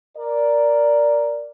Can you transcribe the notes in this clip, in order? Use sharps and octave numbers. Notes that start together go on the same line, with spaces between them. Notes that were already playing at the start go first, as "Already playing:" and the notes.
A#4 D5